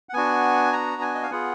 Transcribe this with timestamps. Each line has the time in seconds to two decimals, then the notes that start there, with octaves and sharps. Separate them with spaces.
0.09 F#5
0.13 B3 D4 F#4 G#5
0.73 A#5
1.02 G#5
1.15 D#5
1.23 F5
1.31 B3 F4 G#4 F#5